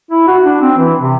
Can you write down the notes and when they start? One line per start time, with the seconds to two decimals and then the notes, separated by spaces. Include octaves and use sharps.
0.11 E4
0.27 F#4
0.45 D4
0.61 C4
0.78 E3
1.01 C3